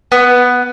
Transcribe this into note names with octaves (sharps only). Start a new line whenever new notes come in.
B3